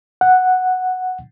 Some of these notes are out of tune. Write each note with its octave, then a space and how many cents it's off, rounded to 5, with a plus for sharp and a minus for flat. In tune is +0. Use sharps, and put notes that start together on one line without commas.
F#5 +0